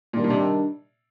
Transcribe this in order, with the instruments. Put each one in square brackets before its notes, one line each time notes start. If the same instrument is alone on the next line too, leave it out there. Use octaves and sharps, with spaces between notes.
[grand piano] A#2 [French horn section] D#3 G3 D4
[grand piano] A#2
C3